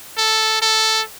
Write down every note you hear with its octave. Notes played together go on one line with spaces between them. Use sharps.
A4
A4